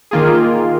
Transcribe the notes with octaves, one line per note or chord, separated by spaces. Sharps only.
D#3 A#3 F4 G#4